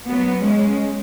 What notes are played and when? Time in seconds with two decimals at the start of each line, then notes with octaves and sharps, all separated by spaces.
0.09 F#3 B3
0.43 G#3 C#4